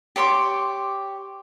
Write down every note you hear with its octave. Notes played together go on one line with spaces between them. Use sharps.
G4 C#5 C6 D6